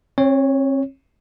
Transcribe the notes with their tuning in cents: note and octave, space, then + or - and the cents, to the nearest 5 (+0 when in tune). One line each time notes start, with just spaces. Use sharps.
C4 +45 C#5 +0